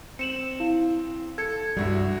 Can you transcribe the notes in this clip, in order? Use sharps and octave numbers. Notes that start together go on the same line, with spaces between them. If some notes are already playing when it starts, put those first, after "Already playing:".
C4 C#7 E7 F#7
E4 F5
A4 G#6 C#7
C2 G2 G3 F#4 E5